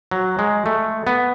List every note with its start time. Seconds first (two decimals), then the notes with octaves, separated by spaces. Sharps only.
0.11 F#3
0.39 G#3
0.66 A3
1.07 B3